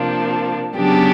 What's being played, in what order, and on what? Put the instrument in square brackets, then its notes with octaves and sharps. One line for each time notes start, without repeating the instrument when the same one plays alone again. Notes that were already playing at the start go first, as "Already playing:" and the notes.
Already playing: [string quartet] C3 F3 A#3 D4
C#3 F#3 B3 D4 G4